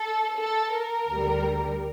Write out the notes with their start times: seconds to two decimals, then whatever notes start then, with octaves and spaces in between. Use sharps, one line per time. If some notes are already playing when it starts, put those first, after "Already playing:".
Already playing: A4
0.38 A4
0.74 A#4
1.10 D2 D3 G3